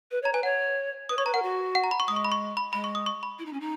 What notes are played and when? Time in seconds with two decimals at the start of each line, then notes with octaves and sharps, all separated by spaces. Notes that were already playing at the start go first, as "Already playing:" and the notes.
0.11 B4
0.22 C#5
0.25 A#5
0.33 B4 G#5
0.43 C#5 F#5
1.09 B4 D#6
1.17 C#5 C#6
1.26 B4 A#5
1.34 A#4 F#5
1.42 F#4
1.75 F#5
1.84 A#5
1.91 B5
2.00 C#6
2.08 G#3 D#6
2.16 C#6
2.25 B5
2.32 C#6
2.57 B5
2.73 G#3 B5
2.84 C#6
2.95 D#6
3.06 C#6
3.23 B5
3.39 E4
3.45 D#4
3.53 C#4
3.60 D#4